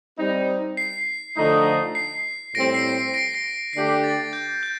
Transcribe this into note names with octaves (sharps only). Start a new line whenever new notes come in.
G3 C4 D#4
C7
D3 F3 A3 D#4
C7
A2 G3 C4 A#6 D7
C7
C7
A#6 D7
C7
D3 A3 D4 G4 C7
C7
A6
G6
G6